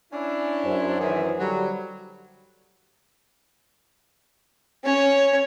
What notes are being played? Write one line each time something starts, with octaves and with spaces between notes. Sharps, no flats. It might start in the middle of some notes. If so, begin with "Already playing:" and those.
C#4 D4 E4
F#2 C5
D#3 E3 G#4
D3 F#3 G3
C#4 C#5